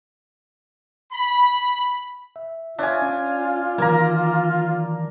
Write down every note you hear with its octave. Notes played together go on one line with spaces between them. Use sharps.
B5
E5
D4 F4 C#5 E5 G#5
C#4
D#3 E3 F#3 A#3 A#5